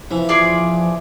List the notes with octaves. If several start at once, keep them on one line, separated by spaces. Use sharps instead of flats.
C3 E3 F3 E4
F4 G#4 D5